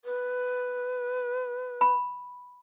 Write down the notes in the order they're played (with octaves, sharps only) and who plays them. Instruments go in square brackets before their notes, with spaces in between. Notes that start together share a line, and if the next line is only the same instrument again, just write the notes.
[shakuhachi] B4
[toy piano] B5